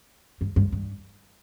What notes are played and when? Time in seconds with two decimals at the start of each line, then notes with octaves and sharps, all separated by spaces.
0.41 G2
0.56 G2
0.72 G2